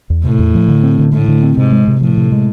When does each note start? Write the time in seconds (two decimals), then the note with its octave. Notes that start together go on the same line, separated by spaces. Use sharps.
0.10 E2
0.24 A2 C3
0.39 E2
0.54 F3
0.68 D3
0.83 C4
0.99 D3
1.13 A2 A3
1.28 D3
1.43 C4
1.57 G#2 C3
1.72 G#3
1.88 C3
2.02 A2 F3
2.17 C3
2.32 G#3